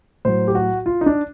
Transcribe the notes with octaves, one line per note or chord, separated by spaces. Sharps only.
A2 F#3 C5
G4
F#4
F4
D#4
D4